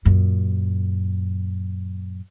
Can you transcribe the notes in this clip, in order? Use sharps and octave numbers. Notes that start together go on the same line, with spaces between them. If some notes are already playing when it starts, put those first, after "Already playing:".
F#2 A#2